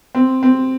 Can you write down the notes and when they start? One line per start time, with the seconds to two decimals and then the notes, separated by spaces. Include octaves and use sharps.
0.15 C4
0.43 C4